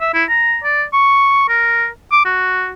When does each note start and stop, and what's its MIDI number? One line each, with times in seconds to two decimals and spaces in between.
0.01 0.09 76
0.14 0.24 64
0.29 0.59 82
0.64 0.84 74
0.93 1.46 85
1.49 1.87 70
2.12 2.21 86
2.25 2.72 66